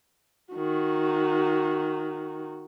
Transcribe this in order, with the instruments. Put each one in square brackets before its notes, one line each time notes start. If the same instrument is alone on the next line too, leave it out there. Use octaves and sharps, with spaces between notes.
[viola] D#3 F#4